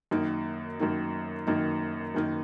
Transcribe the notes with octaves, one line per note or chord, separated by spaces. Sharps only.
F#2 D#3 A#3 D#4
F#2 D#3 A#3 D#4
F#2 D#3 A#3 D#4
F#2 D#3 A#3 D#4